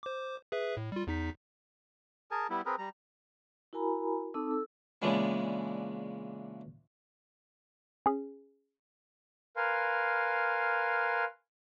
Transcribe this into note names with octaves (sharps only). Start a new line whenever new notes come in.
C5 D6
G#4 B4 E5
A2
G3 F4
E2 D#4 B6
G#4 A#4 G#5 A5
G3 B3 E4
C4 G#4 A#4 B4
G3 A#5
E4 F#4 A#4 G#5 A#5 B5
C4 D#4 A4 A5 D6 E6
A4 E6
A#2 C#3 E3 G#3 B3 D4
C#4 G#4
A#4 B4 F5 G#5 C6